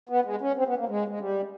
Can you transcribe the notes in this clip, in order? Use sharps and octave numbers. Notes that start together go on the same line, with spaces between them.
B3
G#3
C#4
C4
B3
A#3
G#3
G#3
G3